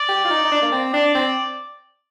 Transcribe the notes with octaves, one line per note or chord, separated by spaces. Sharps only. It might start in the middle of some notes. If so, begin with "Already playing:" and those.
Already playing: D5
G4
F4
D#4
D#4
D4
A#3
C4
D4 D5
C4